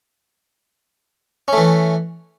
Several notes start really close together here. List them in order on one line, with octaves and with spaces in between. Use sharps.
C#4 A3 E3